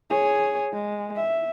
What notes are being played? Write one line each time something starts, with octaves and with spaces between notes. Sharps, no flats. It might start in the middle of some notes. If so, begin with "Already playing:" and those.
G#4 C#5
G#3
E5